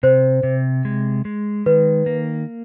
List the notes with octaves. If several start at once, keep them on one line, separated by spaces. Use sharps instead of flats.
C3 C5
C3
G#3
G#3
D#3 B4
A#3